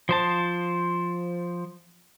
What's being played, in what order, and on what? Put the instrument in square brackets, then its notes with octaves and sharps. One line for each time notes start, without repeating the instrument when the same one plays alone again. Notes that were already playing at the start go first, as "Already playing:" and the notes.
[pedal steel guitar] F3 C5 A5